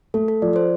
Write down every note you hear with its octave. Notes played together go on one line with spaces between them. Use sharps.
A3 A4
A4
F3 D5
C5